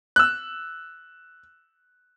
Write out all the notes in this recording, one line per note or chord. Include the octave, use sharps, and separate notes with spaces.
E6 F#6